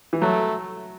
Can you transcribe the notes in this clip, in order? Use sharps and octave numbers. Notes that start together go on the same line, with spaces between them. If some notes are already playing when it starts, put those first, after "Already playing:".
E3
F#3 A3